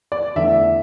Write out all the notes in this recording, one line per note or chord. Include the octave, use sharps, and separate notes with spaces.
D5
E2 D3 A3 E5